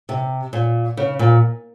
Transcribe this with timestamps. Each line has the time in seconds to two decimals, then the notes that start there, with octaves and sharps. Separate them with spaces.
0.09 C3
0.53 A#2
0.97 C#3
1.19 A#2